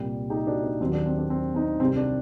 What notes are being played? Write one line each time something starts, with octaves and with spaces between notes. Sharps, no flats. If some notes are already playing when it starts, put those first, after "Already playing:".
Already playing: C2 A#2 G3
D#4 G4
D4 F#4
D4
D#2 D#3 F#3 C4
D4
C4
D4
C4
C4 D#4
C2 C3 G3 C4
D4